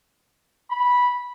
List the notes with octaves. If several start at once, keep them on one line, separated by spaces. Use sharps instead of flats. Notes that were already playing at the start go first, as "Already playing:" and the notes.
B5